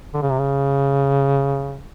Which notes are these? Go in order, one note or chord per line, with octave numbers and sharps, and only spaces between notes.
D3
C#3
C3
C#3